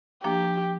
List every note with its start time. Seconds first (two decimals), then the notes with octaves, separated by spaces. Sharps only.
0.24 F3 A#3 D4 G4